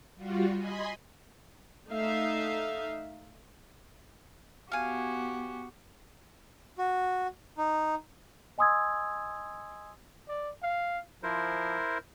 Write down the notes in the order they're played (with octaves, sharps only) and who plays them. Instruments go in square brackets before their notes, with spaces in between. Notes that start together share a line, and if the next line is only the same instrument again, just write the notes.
[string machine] G3 F4 F#4
D#5 G#5 B5 C6
[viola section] A3 D#4 E5 F5
[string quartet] B3 F#4 G4 [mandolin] F5 G#5
[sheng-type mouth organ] F#4
D#4
[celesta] D#5 G#5 C6 D#6 E6 G#6
[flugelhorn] D5
F5
[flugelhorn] F3 [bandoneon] E4 A#4 C5